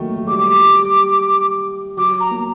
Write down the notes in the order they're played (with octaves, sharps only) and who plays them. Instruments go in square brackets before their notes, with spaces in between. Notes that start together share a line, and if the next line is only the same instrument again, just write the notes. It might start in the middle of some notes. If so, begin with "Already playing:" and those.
Already playing: [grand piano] D#3 F#3 A3 A#3
F#3
[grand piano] G3 [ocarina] D6
[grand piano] G3
[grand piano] F#3 [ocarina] D6
[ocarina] A#5
[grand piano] A#3